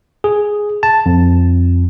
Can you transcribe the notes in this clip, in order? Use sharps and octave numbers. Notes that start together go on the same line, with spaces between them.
G#4
A5
F2